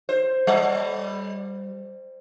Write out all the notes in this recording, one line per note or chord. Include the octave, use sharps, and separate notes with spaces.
C5
G3